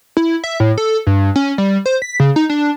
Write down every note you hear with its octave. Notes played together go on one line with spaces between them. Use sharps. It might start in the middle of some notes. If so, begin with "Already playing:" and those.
E4
E5
A2
A4
G2
C#4
G3
C5
B6
C#3
D#4
D4